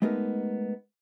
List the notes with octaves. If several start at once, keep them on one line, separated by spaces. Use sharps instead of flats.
G#3 A3 B3 D#4 G4 A#4